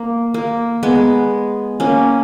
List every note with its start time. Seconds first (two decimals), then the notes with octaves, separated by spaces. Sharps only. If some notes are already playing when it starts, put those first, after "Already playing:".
Already playing: A#3
0.34 A#3
0.83 G#3 B3
1.80 A#3 C#4